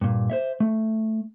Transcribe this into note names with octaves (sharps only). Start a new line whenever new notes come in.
G2 A#2
C5 C#5 E5
A3